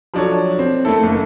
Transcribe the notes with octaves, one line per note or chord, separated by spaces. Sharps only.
F3 F#3 D4 A4 C#5
C4
A3 A#3 E4 A4
F#1 D#3